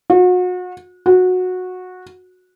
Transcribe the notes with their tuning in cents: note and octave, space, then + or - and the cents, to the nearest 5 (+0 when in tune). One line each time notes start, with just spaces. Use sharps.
F#4 -35
F#4 -15